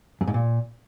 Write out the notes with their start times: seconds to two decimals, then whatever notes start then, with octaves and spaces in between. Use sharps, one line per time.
0.21 F#2
0.27 G#2
0.34 A#2